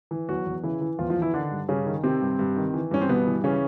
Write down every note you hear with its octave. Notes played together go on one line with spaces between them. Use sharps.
E3
E2 F#3 F#4
E2
C#3 E3 E4
E3
E2 F3 F4
F3 F4
E2
E3 E4
D3 D#3 D4
G2
G2 C#3 C#4
D#3
C3 D#3 C4
G2
G2
D#3
E3
G2 C#4
C4
G2 B2 B3
E3
C#3 E3 C#4